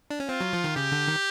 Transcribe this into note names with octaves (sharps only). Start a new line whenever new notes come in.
D4
C#4
C4 F4
F#3
F3
D#3
C#3 G4
D3
D#3